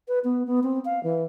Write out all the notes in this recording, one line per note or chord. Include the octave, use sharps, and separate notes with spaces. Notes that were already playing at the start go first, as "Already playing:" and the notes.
B4
B3
B3
C4
F5
E3